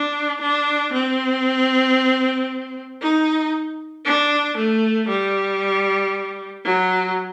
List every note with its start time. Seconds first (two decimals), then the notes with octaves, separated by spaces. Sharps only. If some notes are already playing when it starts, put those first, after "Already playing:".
Already playing: D4
0.42 D4
0.93 C4
3.02 D#4
4.06 D4
4.57 A3
5.09 G3
6.64 F#3